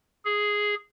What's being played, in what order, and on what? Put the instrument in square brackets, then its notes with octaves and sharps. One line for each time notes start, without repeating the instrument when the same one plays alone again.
[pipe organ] G#4